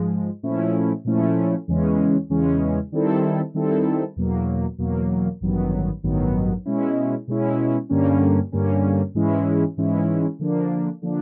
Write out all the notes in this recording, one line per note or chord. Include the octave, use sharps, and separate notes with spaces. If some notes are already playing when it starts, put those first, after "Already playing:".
Already playing: G#2 F3 G#3
A#2 F3 A3 C#4 E4
A#2 F3 A3 C#4 E4
E2 C#3 E3 G#3 C#4
E2 C#3 E3 G#3 C#4
D#3 G3 C4 E4 A4
D#3 G3 C4 E4 A4
E2 B2 F#3 A#3
E2 B2 F#3 A#3
A1 G2 D#3 F#3 B3
A1 G2 D#3 F#3 B3
B2 G#3 C#4 E4
B2 G#3 C#4 E4
G2 D3 G3 A#3 C#4
G2 D3 G3 A#3 C#4
G#2 E3 G#3 C#4 E4
G#2 E3 G#3 C#4 E4
D3 F3 A#3 D4
D3 F3 A#3 D4